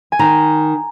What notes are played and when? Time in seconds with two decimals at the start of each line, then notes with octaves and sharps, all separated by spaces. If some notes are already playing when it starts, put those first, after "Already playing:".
0.12 G#5
0.19 D#3 A#5